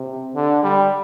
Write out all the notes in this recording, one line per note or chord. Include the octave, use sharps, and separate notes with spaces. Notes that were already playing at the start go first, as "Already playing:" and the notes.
Already playing: C3
D3
G3